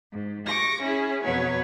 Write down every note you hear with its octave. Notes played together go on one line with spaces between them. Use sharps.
G#2
C#6 D6 A#6
C#4 E4 G#4
F2 B2 F#3 B4 C#5